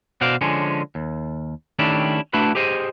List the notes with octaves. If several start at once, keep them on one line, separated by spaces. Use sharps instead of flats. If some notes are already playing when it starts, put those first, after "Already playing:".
B2 F#4 C5 D5 F5
D3 F3 G#3 C#4
D#2
D#3 A3 C#4 D4 E4 G4
A3 D4 E4 F#4 B4
G4 G#4 C5 D#5